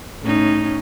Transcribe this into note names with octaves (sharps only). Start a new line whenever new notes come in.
A2 C#4 D#4